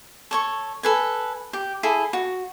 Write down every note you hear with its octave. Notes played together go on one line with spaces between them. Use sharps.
A4 C#5 C#6
A4 B4 G#5
G4
E4 G#4 A4
F#4